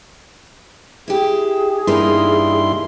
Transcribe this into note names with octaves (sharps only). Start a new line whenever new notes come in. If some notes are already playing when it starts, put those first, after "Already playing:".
E4 G4 G#4
G2 E3 A#3 D#4 E4 C6